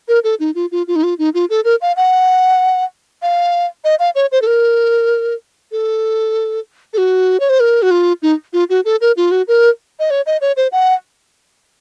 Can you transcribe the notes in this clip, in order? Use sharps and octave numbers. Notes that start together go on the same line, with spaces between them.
A#4
A4
D#4
F4
F4
F4
D#4
F4
D#4
F4
A4
A#4
F5
F#5
F5
D#5
F5
C#5
C5
A4
A#4
A4
A4
F#4
C#5
C5
A#4
F#4
F4
D#4
F4
F#4
A4
A#4
F4
F#4
A#4
D#5
C#5
D#5
C#5
C5
F#5